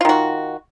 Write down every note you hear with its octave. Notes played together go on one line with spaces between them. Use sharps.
D#3 F4 F#4